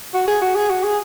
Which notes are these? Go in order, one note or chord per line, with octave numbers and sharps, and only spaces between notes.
F#4
G#4
F#4
G#4
F#4
G#4